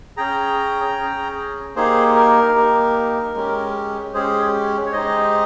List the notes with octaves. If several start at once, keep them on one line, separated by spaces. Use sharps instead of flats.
C#4 G#4 G5 A#5
C#4 G#4
A#3 D#4 G4 G#4 C5
A#4
A#3 D#4 G4
G#3 C#4 G4
G#3 C#4 G4 G#4 C5
C#5
G#3 D#4 G4 C5 D#5